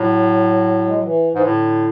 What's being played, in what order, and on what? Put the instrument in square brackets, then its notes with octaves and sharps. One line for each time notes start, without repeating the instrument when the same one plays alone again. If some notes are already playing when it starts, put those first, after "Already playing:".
Already playing: [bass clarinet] A2 [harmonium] F#3
[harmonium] G#3
F#3
E3
[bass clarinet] G#2 [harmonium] E3
[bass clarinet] A2 [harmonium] D3